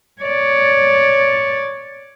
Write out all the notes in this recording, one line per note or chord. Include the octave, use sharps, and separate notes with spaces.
C#5 D5